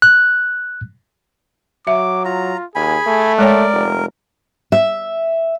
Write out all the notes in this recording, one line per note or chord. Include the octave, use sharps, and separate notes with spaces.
F#6
F#3 E5 D6
F4 A#5
D#2 G#4 G#5 B5
A3
G#3 A#4 C#5 D5 G5
F1
E5